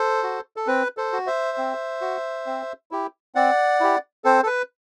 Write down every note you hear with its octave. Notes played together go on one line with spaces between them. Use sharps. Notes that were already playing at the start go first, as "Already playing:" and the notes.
Already playing: A4 C5
F#4
A4
C4 B4
A4 C5
F#4
C5 E5
C4
F#4
C4
E4 G4
C4 D5 F#5
E4 G4
C4 A4 C5
A4
B4